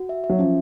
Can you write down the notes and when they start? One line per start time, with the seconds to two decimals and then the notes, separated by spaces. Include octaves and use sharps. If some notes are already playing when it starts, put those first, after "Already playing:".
Already playing: F#4
0.09 E5
0.24 E5
0.29 F#3
0.39 F3 C#4